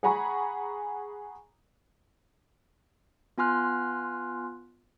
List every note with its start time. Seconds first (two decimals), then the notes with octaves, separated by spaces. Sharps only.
0.03 G#4 F#5 G#5 A#5 B5 C#6
3.38 B3 F4 G#5 C6 F6 F#6